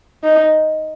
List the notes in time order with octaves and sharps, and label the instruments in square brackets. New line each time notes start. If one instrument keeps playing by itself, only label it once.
[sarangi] D#4